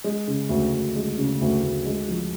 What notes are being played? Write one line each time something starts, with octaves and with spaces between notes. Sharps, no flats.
G#3
C#3
D2
D2
G#3
C#3
D2
D2
G#3
F3